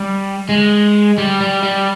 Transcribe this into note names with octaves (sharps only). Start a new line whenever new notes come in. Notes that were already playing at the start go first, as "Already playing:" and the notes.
Already playing: G3
G#3
G3
G3
G3